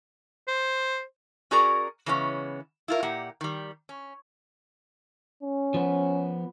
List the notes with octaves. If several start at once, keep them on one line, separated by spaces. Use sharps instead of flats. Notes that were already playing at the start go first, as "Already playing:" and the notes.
C5
C#4 F#4 G#4 A#4 D5 A#5
C#3 E3 G#3 B3 C#4
E4 F4 A#4
A#2 A#3 G4 F#5
D#3 G3
C#4
C#4
F3 B3